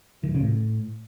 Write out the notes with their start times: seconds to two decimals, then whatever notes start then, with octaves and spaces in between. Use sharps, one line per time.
0.23 D#3
0.29 E3
0.35 C#3
0.40 A2